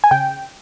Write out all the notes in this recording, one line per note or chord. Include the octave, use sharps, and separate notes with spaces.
G#5
C#3 G5